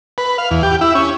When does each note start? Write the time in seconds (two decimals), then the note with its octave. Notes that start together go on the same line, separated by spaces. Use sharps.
0.18 B4
0.38 F5
0.51 E2
0.63 G4
0.81 E4
0.95 C#4